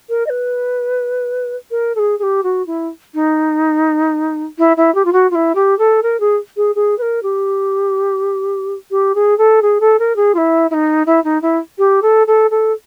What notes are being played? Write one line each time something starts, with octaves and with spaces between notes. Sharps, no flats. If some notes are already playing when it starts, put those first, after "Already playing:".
A#4
D#5
B4
A#4
A4
G#4
G#4
G4
F#4
E4
D#4
E4
E4
G4
F4
F#4
F4
E4
G4
A4
A#4
G#4
G#4
G#4
B4
A#4
G4
G4
G#4
A4
G#4
A4
A#4
G#4
F4
E4
E4
D#4
E4
D#4
E4
G4
A4
A4
A4